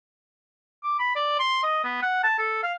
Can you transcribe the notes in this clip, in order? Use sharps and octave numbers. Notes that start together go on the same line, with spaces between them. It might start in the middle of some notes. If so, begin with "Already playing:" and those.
D6
B5
D5
C6
D#5
B3
F#5
A5
A4
F5